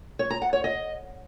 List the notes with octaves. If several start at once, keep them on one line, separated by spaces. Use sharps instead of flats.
C#5
A#5
F#5
C#5
D#5